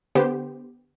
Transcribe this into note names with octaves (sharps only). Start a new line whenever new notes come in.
D3 B3 G4 C5